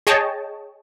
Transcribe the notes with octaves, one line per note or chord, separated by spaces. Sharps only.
G#4 C#5 D#5 G5 A5